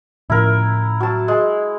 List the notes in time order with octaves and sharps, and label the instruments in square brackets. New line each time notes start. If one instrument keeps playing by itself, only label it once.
[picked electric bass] A2 C#3 F3 [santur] E4 A#4
[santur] F#3 A5
G#3